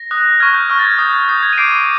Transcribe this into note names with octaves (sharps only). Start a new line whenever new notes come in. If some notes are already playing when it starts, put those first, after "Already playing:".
Already playing: A#6
D#6 F#6
C#6 F6 G#6
G6
C#6 F6
A6
G#6
D#6 G6
D#6 G6
G#6
D#7
D6 G6 C7 D7